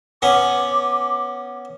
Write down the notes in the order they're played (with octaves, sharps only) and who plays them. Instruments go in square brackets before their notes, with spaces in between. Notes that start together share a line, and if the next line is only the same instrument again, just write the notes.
[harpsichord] B3 C#4 [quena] D6